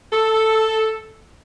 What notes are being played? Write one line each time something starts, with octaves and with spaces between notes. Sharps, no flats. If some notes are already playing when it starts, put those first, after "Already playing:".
A4